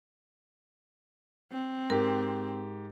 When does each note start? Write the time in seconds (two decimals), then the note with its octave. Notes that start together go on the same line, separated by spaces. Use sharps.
1.52 C4
1.90 G#2 G4 A#4